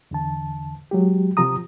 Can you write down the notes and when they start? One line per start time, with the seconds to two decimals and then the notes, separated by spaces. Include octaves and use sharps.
0.11 E2 D3 A5
0.91 F#3 G#3 G4
1.37 C3 F3 G4 A#5 D#6